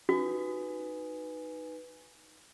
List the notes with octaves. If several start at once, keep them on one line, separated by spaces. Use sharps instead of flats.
D#4 F#4 B4 G#5